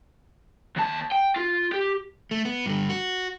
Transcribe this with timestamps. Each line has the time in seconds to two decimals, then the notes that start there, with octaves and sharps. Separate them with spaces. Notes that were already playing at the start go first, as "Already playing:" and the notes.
0.76 D#2 A5
1.11 G5
1.36 F4
1.72 G4
2.31 A3
2.45 B3
2.66 G2 D3
2.89 F#4